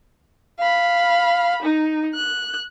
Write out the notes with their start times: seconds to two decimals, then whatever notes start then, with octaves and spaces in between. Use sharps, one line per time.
0.59 F5 B5
1.62 D#4
2.15 F#6